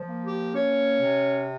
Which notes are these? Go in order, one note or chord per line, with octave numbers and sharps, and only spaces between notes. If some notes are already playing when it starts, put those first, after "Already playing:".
Already playing: F3
A#3
G4
C#4 C#5
C3